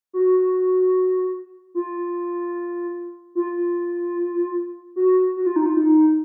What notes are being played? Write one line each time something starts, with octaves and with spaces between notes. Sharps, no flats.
F#4
F4
F4
F#4
F#4
F4
D#4
F4
D#4